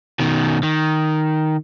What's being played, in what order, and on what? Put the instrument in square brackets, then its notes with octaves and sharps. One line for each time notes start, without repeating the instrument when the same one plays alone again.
[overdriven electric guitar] B2 D#3
D#3